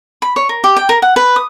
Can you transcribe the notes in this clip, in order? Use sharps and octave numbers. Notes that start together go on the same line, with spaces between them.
B5
C#5
A#4
G4
G5
A#4
F#5
B4
D#6